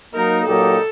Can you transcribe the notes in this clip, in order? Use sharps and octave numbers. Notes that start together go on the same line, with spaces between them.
F#3 A#3 D#4 A#4
A#2 F#3 A#3 D#4 G4 A4